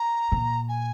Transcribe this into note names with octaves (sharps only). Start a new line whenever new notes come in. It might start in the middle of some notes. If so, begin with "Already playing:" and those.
Already playing: A#5
A#2
G#5